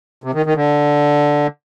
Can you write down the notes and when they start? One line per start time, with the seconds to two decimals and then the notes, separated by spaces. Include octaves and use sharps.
0.24 C3
0.34 D#3
0.46 D#3
0.56 D3